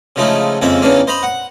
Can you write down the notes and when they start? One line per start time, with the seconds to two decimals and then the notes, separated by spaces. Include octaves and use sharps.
0.16 C#3 F3 G#3 A3 D#4 E4
0.61 F2 C#3 G#3 A#3 E5
0.82 E2 C#3 E3 A#3 C#4 D4
1.07 C5 D#5 A#5 B5
1.23 F#5